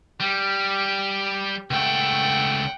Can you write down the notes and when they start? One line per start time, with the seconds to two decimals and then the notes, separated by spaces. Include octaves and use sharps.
0.21 G3 G4
1.71 C#2 A3 F#5 G5